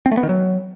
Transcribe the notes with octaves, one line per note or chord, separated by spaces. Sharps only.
C4
A3
B3
D#3
F#3